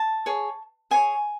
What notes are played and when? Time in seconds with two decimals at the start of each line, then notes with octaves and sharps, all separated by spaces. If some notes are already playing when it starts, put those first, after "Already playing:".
Already playing: A5
0.26 G#4 C#5
0.91 G#4 C#5 G#5